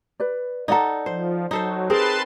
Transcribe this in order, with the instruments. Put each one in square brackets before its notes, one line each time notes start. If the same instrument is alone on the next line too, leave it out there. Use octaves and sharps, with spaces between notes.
[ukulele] B4 D5
[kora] D#4 A4 [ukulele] D5 F#5 A#5
[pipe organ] F3 [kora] C5
[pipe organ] F#3 [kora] D#4 A4 C5
[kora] C4 A#4 [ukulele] G#4 [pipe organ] B4 A5 C6